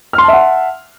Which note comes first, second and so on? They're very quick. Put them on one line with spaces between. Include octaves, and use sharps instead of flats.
F6 C6 A5 E5 F#5